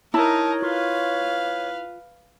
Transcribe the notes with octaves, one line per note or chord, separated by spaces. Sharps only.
D#4 E4 A#4 C#5 A5
F4 B4 F5